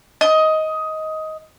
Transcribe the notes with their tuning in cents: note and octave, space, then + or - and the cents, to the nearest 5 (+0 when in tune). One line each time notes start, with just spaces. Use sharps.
D#5 +15